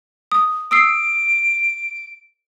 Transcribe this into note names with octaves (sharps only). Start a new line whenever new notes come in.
D#6
D#6 E6 C7 D7